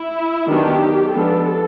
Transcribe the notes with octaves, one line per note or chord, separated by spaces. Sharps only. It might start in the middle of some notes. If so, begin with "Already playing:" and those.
Already playing: E4
D#3 F#3 B3 D4 G4
F3 G#3 B3 D4 A4